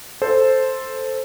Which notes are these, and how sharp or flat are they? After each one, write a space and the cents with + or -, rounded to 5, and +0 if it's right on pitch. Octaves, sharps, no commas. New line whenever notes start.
A4 +0 C5 +0